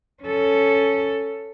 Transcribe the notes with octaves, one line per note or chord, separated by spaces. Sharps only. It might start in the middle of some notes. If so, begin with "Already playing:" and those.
C#4 A4